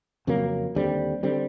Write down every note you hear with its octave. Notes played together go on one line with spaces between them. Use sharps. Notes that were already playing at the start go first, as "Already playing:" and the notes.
F2 C#3 F#3 A#3
D#2 D3 G3 C4
D3 G3 C4